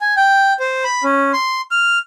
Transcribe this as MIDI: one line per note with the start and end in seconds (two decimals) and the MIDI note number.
0.01 0.14 80
0.17 0.53 79
0.60 0.84 72
0.84 1.04 83
1.04 1.32 61
1.33 1.61 84
1.71 1.99 89